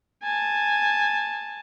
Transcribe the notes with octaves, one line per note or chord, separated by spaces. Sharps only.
G#5 A5